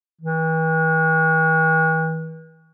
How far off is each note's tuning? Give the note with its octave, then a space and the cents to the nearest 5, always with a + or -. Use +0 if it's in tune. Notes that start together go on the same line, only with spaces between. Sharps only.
E3 -45